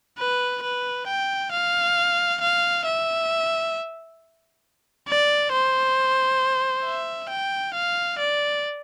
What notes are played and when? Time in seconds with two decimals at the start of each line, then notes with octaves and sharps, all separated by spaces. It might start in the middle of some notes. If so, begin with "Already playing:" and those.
0.19 B4
0.63 B4
1.07 G5
1.52 F5
2.41 F5
2.85 E5
5.08 D5
5.52 C5
6.84 E5
7.29 G5
7.74 F5
8.19 D5